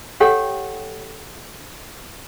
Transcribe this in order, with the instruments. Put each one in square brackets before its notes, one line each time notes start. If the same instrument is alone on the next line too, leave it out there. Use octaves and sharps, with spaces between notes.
[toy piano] G4 A4 C#5 F#5 G5